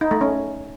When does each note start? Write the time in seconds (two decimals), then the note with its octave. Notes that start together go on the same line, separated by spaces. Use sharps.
0.01 D#4
0.11 A3
0.21 C#4